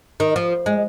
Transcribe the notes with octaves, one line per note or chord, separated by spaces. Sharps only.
D#3
F3
G#3